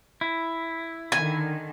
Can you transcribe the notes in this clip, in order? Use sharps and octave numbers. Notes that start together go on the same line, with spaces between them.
E4
D3 D#3 G#5